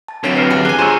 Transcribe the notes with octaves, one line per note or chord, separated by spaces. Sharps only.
A5 A6
D3 F#3 B3 C4 C#5 G5
B4 F6 A#6 C7 C#7
D4 G4 G#4
B3 G#5 F#6 C7 G7
G#3 F4 C5 C#5 A#5 C#6 E6 D#7